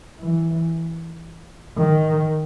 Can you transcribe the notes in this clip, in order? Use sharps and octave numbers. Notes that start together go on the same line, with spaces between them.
E3
D#3